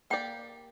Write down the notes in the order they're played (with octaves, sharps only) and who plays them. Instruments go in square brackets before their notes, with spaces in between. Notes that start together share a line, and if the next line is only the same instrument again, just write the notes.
[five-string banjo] A#3 G4 D5 [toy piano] G5